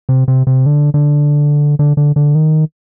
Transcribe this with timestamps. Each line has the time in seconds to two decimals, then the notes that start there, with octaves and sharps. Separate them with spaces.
0.09 C3
0.28 C3
0.47 C3
0.66 D3
0.94 D3
1.79 D3
1.97 D3
2.16 D3
2.35 D#3